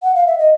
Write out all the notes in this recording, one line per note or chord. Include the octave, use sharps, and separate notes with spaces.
F#5
F5
E5
D#5